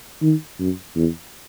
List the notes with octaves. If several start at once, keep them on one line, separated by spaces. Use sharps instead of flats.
D#3
F#2
E2